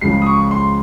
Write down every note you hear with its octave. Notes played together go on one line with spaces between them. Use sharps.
C#2 C#3 F3 C7
D#6
C#6
C6